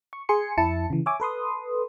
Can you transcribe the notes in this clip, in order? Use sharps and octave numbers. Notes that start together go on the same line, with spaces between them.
C#6
G#4 G#5 C6 C#7
F2 E4 A5 C#7
C#3 E3
C#5 E5 G#5 D6
A4 B4 C6 D#6